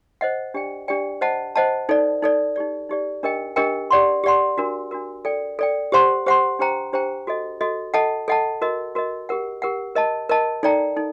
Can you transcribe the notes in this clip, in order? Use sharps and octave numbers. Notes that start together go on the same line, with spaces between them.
C5 D#5 F#5
D4 G4 D5 G5
D4 G4 D5 G5
C5 D#5 F#5 A5
C5 D#5 F#5 A5
D#4 A4 D5
D#4 A4 D5
D#4 G4 D5
D#4 G4 D5
D4 G4 A#4 D#5 G5
D4 G4 A#4 D#5 G5
G4 D5 F#5 C6
G4 D5 F#5 C6
D4 F#4 A#4
D4 F#4 A#4
A4 D5 G5
A4 D5 G5
G4 C5 F#5 C6
G4 C5 F#5 C6
D4 G4 C5 G5 A#5
D4 G4 C5 G5 A#5
F#4 A4 D#5
F#4 A4 D#5
A4 D#5 F#5 A5
A4 D#5 F#5 A5
F#4 A#4 D#5
F#4 A#4 D#5
G4 A#4 F#5
G4 A#4 F#5
A#4 D#5 A5
A#4 D#5 A5
D#4 A4 D5 G5 A#5
D#4 A4